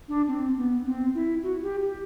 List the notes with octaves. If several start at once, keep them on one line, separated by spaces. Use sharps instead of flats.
D4
C4
B3
C4
E4
F#4
G4
G4